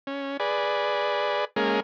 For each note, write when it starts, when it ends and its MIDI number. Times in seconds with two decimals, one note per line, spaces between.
0.07 0.37 61
0.40 1.45 68
0.40 1.45 71
0.40 1.45 74
1.56 1.80 56
1.56 1.80 58
1.56 1.80 61
1.56 1.80 68
1.56 1.80 70